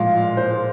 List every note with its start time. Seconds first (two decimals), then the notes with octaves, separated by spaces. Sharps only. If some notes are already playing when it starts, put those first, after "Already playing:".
Already playing: A#2 F3 G#3 F5
0.37 C5